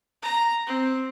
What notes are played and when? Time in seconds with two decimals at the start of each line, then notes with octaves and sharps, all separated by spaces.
0.23 A#5
0.67 C4